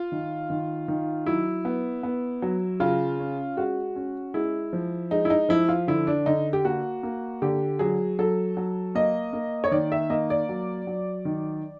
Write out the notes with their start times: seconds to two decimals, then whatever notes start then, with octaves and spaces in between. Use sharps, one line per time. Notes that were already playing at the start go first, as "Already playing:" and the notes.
Already playing: F4
0.12 D#3
0.50 D#3
0.88 D#3
1.26 F#3 E4
1.65 B3
2.03 B3
2.42 F#3
2.80 C#3 F4
3.19 C#4
3.57 G#3 F#4
3.96 C#4
4.34 G#3 E4
4.73 F3
5.11 G#3 D#4
5.25 E4
5.30 D#4
5.49 F3 E4
5.69 F4
5.88 D3 E4
6.07 D4
6.26 D3 D#4
6.53 G4
6.65 A#3 F#4
7.03 A#3
7.42 D3 G4
7.79 F#3 G#4
8.19 F#3 A4
8.57 F#3
8.95 A#3 D#5
9.33 A#3
9.64 C#5
9.71 D#3 D5
9.92 E5
10.10 A#3 D#5
10.30 D5
10.49 F#3
10.87 F#3
11.25 D#3